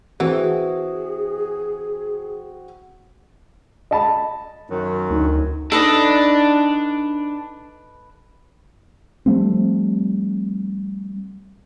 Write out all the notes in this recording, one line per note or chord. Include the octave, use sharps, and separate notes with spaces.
E3 C4 F#4 G#4
D#5 A5 B5
F#2 D#3 F#3
D2 D#4
D4 D#4 A4 B4 D#5
F3 G3 A3 C4